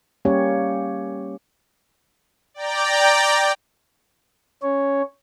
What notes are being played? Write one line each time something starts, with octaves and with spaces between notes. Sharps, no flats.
G3 A#3 C#4 G4 C#5
D5 G5 A#5
C#4 C#5